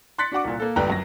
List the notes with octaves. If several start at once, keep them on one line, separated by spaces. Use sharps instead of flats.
C6 F#6 A6 B6 C#7
D4 F#4 F#5 D6
C2 A#2
A#3 A4
G1 C#2 G3 G5 A#5 F#6
F#2 A#6